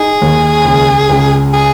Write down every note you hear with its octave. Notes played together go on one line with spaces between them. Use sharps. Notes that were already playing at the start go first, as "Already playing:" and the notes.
Already playing: D#4 G#4
D#2
C#2
C#2
G#4